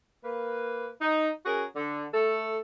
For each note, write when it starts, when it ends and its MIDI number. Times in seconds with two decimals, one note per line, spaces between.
0.24 0.88 58
0.24 0.88 71
1.02 1.30 63
1.46 1.64 61
1.46 1.64 66
1.46 1.64 68
1.46 1.64 70
1.76 2.06 50
2.14 2.59 57
2.14 2.59 69